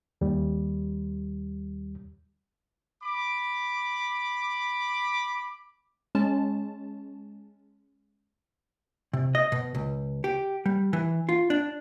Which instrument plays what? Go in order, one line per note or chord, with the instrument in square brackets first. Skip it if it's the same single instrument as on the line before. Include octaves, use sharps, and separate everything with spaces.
[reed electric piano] D#2 G3
[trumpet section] B5 D6
[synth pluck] G#3 C#4 A5
[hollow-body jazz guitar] C3
D#5
B2
C#2
G4
G3
E3
F4
D4